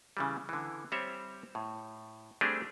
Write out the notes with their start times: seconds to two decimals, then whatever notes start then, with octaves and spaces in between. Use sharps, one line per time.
0.17 C#3 E3 G3
0.49 D3 E3
0.92 G3 C4 C5 C#5 E5
1.55 A2
2.41 G3 A3 C4 D4 G4 G#4